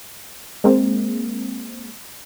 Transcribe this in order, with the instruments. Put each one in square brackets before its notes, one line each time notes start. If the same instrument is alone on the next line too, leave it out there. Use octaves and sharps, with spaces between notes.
[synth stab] G#3 A#3 C4